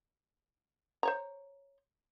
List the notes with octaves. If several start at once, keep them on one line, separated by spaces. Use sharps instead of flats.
C5 C#5 A#5